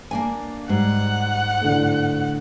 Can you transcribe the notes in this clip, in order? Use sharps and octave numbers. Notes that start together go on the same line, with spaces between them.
A#3 D4 G#5
G#2 G3 F#5
A2 D3